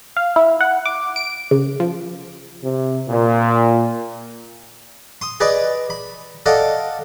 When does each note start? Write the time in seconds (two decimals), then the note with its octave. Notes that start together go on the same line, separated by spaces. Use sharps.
0.17 F5
0.36 E4
0.61 F#5
0.86 D6
1.16 D7
1.51 C#3
1.80 F3
2.64 C3
3.08 A#2
5.21 C6 D#6
5.40 G#4 B4 D5 D#5 B5
5.90 B5
6.46 A4 D5 D#5 F5 F#5